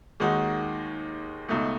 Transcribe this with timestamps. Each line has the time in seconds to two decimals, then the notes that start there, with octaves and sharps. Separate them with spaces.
0.20 D#2 D#3 G#3 D#4 F#4
1.48 C#2 B2 A3 D#4